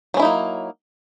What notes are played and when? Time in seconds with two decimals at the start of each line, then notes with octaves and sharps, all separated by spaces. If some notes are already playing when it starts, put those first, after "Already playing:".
0.14 F#3
0.17 C#4
0.20 E4
0.22 D#4
0.25 A#3